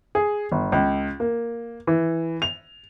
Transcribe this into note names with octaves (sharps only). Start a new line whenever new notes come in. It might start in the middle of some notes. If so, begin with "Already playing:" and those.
G#4
G1
C#2
A#3
E3
F7